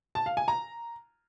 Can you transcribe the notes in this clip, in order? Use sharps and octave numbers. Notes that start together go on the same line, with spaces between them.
A5
F5
G#5
A#5